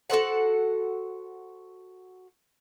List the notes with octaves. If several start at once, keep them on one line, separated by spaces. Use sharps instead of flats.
F#4 A4 C5 F#5